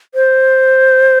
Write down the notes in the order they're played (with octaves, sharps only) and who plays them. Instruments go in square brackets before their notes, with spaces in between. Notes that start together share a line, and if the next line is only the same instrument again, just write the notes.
[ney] C5